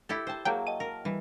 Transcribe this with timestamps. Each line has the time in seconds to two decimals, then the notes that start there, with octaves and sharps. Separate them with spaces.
0.09 E4 G4 A4
0.27 C5 E5 G5 A5
0.45 F#3 A#3 G#4 G5 A5
0.67 D#5 G5 A5 D#7
0.80 A#4
1.05 E3 G3